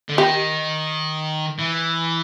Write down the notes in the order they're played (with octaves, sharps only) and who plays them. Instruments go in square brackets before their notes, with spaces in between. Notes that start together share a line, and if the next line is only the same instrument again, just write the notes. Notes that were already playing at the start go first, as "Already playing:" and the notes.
[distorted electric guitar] D3
[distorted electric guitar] D#3 [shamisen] G4
[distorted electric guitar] E3